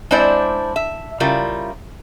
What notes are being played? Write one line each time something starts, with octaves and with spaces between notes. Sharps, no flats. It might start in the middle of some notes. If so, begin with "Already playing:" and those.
G#3 C4 D4 E4 C5 D5
E5
C#3 G3 E4 F4 A#4